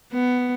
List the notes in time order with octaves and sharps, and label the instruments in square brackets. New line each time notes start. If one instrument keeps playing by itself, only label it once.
[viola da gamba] B3